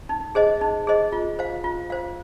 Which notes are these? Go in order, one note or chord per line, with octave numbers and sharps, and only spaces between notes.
D#4
G#4 C5 D#5
D#4
G#4 C5 D#5
F4
C5 F5
F4
C5 F5